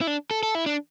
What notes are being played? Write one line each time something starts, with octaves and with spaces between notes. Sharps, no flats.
E4
D4
A4
A4
E4
D4